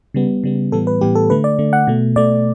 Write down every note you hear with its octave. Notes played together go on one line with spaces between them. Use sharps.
C#3 G3 B3
C#3 G3 B3
A2 E3 G3 B3 A4
B4
A2 E3 G3 B3 G4
A4
D3 A3 B4
D5
D3 A3
F#5
B2 A3
B2 A3 D5